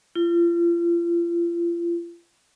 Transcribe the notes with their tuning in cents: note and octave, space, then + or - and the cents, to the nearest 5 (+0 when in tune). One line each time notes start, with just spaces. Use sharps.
F4 -35